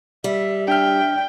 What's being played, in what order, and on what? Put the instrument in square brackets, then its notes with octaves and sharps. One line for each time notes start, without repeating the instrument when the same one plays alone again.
[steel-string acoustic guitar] G3 [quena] E5
[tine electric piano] D4 F6 [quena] E5 [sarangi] G5